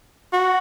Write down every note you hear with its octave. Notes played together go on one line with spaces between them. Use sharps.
F#4